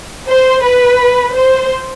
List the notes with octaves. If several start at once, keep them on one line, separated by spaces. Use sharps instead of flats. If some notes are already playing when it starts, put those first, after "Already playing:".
C5
B4
C5